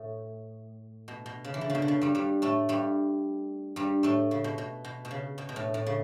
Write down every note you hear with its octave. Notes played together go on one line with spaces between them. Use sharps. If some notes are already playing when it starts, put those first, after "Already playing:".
Already playing: A2
B2
B2
C#3
E3
D3
C#3
B2
D3
C#3
G2 G3
G2 G3
A2 A3
G2 G3
G2 G3
A2 A3
C#3
B2
B2
B2
B2
C#3
B2
B2
A2
A2
C#3